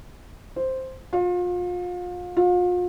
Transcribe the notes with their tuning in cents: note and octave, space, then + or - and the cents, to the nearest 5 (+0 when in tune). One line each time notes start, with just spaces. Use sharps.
C5 +0
F4 +35
F4 +40